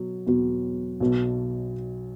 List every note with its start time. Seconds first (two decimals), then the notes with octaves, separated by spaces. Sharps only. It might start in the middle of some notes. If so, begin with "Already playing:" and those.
Already playing: B2 F#3
0.26 E2 B2 F#3
1.00 B1 B2 F#3